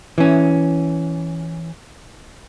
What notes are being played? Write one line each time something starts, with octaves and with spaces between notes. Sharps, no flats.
E3 C#4